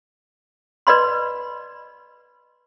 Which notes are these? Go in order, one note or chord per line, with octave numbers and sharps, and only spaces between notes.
B4 D5 D#5 B5 C6